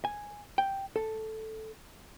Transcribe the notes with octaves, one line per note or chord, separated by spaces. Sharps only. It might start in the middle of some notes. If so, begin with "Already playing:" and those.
G#5
G5
A4